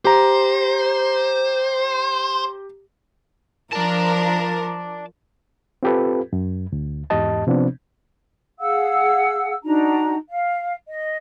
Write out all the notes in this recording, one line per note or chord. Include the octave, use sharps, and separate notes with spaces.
G4 C5 A#5
F3 A#4 D5 A5
C4 F4 G4 A4 B4
F#2
D2
E2 G#2 G4 D#5 A5
C3 F3 B3 C4 D4
G#4 F5 F#5 E6
D4 D#4 F#4 A#5
F5
D#5